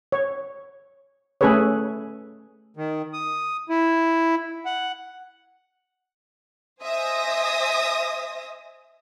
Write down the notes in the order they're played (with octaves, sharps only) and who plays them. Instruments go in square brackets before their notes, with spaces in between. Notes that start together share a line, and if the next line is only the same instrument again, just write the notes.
[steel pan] C#5
A3 C#4 G#4 A4 B4 C#5
[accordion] D#3
D#6
E4
F#5
[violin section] C5 D#5 E5 G#5 D#6 A#6